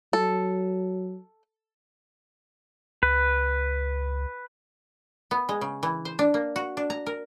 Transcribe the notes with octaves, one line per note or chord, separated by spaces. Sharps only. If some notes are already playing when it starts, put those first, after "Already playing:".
F#3 A4
C#2 B4
B3
G#3
C#3
E3
C5
D4
A#3
F#4
D4
A#5
A#4